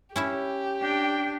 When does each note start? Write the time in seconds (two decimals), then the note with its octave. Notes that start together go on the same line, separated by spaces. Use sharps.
0.16 C#4 E4 G4 E5
0.81 D4 G5